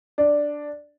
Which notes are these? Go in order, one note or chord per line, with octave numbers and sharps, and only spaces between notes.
D4